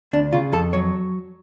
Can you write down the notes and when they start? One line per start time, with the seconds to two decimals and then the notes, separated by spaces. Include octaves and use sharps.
0.13 D2 D4
0.33 C#3 F4
0.53 F2 A4
0.73 F#3 C#5